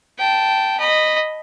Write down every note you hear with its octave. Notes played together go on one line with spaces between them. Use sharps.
G5 A5
D#5 B5